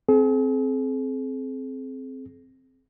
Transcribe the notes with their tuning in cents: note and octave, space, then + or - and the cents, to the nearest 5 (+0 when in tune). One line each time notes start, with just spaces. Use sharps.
C4 +0 G#4 +45